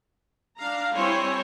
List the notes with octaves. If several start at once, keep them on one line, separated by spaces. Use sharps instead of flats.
D4 F5 A#5
G3 C4 E4 C5 C#5 G#5